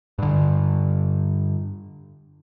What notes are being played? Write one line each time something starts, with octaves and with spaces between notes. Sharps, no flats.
G2 D3